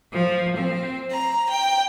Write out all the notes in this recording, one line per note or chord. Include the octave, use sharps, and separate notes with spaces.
F3
C4
A#5
G5